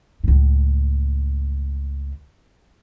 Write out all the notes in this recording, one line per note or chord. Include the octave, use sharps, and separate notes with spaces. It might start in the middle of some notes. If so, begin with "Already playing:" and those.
C#2 A2